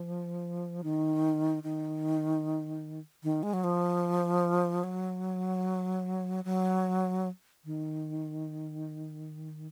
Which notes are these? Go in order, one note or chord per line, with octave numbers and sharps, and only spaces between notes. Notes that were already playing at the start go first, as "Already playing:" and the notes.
Already playing: F3
D#3
D#3
D#3
G#3
F#3
F3
F#3
F#3
D#3